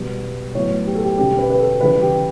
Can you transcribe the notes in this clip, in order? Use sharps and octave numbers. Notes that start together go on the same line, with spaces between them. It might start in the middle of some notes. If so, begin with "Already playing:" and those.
Already playing: B2 G3 B3
A2 F#3 B3 C#5
G4
A4
G4
B2 G3 C#4 G4
B4
B4
A4
C#3 E3 G3 B4
G4